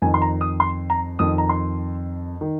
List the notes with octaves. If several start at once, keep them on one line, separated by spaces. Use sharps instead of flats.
F2 D#3 G#5
C6
A#5
D#6
C6
A#5
F2 D#3 D#6
A#5
C6
D#3